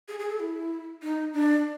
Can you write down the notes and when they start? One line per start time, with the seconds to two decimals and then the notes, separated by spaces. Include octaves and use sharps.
0.08 G#4
0.19 G#4
0.29 A4
0.40 E4
1.03 D#4
1.33 D4